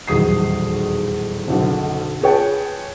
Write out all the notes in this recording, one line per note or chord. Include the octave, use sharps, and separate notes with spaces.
D#1 B1 E2 D#6 C7
F#1 B1 D3
F4 G#4 B4 C#5 G5 A5